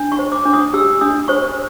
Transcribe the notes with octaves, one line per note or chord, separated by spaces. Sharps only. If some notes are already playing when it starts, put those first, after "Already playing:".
Already playing: D4
C#6
C5
D6
D4
D#6
G4 E6
D4 D#6
C5 C#6